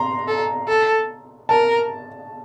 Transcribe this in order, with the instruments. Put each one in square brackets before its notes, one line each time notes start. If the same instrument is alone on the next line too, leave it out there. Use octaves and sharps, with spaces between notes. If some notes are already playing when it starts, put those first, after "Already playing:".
Already playing: [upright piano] A#5 C6
[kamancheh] A4
A4
[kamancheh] A#4 [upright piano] A5